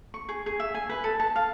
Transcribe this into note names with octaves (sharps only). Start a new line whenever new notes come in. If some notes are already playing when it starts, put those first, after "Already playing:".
C#6
G#4
G#4
E5
G#5
B4
A4
A5
F5